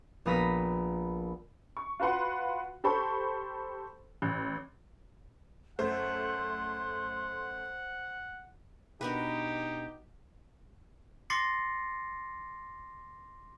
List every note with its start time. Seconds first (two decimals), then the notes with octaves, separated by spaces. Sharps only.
0.25 A#1 B3 A#4 D#6 A#6 B6
1.77 C#6
2.00 F4 F#4 B4 F#5 C6
2.84 G4 A4 C5 B5 C#6
4.22 A1
5.79 F#2 A3 C5 F#5 C6
9.01 B2 D4 D#4 F#4 G4 A#4 B4
11.30 C6 D6 A6 A#6 C7 C#7